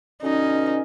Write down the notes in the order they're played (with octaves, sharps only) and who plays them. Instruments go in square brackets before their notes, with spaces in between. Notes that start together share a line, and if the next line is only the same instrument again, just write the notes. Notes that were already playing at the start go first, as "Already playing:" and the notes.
[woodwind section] B2 D3 C#4 [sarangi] D#4